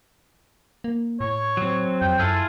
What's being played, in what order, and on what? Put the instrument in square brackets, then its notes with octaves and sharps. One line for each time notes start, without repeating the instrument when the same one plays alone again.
[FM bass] A#3
[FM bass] A2 [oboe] C#5
[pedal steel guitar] F#3 C4
[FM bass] F2 [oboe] G5
[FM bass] F#2 [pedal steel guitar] E4 F4 G#4 [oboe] A4